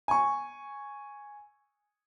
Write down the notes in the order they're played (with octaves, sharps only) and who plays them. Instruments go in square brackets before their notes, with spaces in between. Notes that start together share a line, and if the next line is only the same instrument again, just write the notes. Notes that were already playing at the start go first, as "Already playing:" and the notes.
[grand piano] G#5 C#6